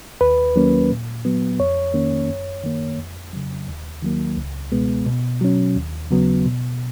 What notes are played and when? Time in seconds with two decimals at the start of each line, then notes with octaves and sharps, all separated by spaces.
0.21 D#2 B4
0.56 D#3 F#3 A#3 C#4
0.90 A#2
1.25 F#3 B3
1.60 F2 C#5
1.94 D#3 A#3 C#4
2.29 F#2
2.64 D#3 A#3
2.99 F2
3.33 C#3 F#3
3.68 D#2
4.02 D#3 F#3 A#3
4.37 C#2
4.72 B2 G#3 B3
5.07 B2
5.41 F#3 C#4
5.76 D#2
6.11 C#3 F#3 B3
6.45 B2